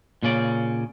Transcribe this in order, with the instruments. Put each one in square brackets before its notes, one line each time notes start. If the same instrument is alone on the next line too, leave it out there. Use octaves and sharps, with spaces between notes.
[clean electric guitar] A#2 C#3 C#4 D5